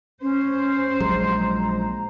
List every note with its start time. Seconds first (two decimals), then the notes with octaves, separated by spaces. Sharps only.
0.22 C#4 C5
1.00 A#1 F#3 G#3 A#5